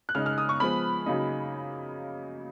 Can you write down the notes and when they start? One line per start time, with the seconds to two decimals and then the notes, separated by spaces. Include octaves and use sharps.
0.09 F#6
0.15 C#3 G#3 D#4 F6
0.26 F6
0.38 D#6
0.49 C#6
0.60 F3 G#3 B3 B5
1.06 C#3 F#3 A#3 D#4